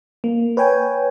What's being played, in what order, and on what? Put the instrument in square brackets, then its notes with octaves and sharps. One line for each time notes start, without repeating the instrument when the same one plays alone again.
[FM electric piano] A#3
B4 C#5 G5 G#5